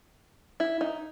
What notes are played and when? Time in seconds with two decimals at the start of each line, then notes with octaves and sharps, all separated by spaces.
0.60 E4
0.81 D#4